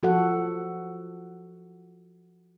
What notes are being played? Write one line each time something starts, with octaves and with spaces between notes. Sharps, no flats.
F3 F#4 A4 F#5